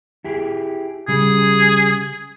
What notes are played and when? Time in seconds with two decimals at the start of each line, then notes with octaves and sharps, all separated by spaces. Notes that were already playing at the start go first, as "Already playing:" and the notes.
0.25 E4 G4 G#4
1.08 C#3 G3 G#4